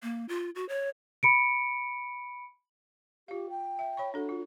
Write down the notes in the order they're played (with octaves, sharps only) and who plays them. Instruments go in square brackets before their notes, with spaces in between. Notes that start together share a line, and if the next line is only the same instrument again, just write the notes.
[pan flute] A#3
F4
F#4
C#5
[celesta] B5 C#7 D7
[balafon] F4 F5 [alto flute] G4
[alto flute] G5
[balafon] E5
C#5 B5 C#6
[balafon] D4 A4 [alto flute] F#4
[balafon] F4